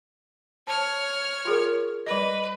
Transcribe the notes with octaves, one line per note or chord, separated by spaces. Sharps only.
C#5 A5 F6
F4 G#4 A#4
G3 B4 D#5